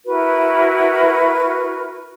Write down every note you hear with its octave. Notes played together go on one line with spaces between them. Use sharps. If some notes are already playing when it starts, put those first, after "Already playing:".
E4 F#4 A#4 B4